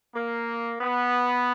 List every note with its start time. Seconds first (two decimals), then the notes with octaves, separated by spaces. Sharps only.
0.15 A#3
0.81 B3